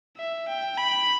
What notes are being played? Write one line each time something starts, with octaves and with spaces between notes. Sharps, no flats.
E5
G5
B5